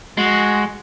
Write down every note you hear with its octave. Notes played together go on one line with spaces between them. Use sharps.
G#3 F#4